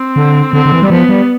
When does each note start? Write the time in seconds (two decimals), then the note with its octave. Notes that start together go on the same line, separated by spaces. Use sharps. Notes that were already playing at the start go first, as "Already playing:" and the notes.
Already playing: C4
0.16 D3
0.53 D3 C4
0.66 D3
0.72 E3
0.82 G3
0.90 F3 B3
1.09 G3